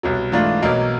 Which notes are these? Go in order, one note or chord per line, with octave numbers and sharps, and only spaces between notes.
C2 B2 F#3
G#2 E3 A3 D4 F4
B1 B2 F#3 A#3